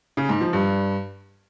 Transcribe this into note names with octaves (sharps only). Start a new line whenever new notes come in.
C#3
G#2
F3
G2